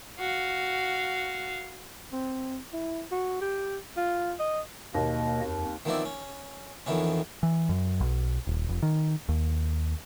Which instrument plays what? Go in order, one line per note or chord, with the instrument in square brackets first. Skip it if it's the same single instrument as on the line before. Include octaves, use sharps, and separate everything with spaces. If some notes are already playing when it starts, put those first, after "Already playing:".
[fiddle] F#4 F5
[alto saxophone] C4
E4
F#4
G4
F4
D#5
[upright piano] D#2 [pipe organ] B2 A#3 D#5
[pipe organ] F2
[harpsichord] D#3 F3 B3 C4 E4 D5
C#4
F2 D#3 E3 B3 C#4
[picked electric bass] E3
F#2
B1
D#1
F1
D#3
D#2